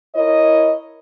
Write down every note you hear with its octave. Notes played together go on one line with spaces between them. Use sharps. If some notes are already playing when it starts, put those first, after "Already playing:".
E4 A#4 C#5 D#5